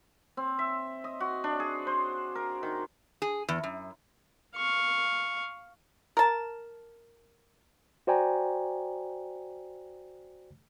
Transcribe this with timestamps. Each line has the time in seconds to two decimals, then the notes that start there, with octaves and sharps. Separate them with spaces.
0.37 C4
0.59 E5
1.04 D#5
1.20 F#4
1.44 D4
1.60 G#4
1.87 C5
2.35 A#4
2.63 D#3
3.22 G#4
3.49 E2
3.64 F#2
4.55 F5 C#6
6.17 A#4 A5
8.07 F#4 C5 D5 G5 G#5 A#5